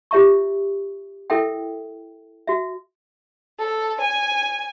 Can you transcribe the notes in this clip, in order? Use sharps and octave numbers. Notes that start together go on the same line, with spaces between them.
F4 G4 C#5 E5 A#5 C#6
E4 A4 A#4 E5 G5
F#4 E5
A4
G#5